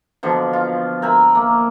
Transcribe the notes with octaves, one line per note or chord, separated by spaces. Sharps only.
B2 D3 F3
F4
A#4 E5 G#5 B5
A#3